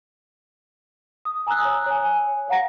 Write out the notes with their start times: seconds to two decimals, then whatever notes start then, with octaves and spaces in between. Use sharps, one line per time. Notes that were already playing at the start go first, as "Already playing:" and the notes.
1.25 D#6
1.47 G#5 A#5 D#6 E6 F#6
1.65 C#5
1.86 C#5 G#5
2.48 C#5 F5 F#5 A#5 A#6